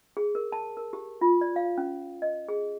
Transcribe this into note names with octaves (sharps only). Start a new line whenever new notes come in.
G#4
A#4
A5
A#4
G4
F4
D5
F5
C#4
D#5
G#4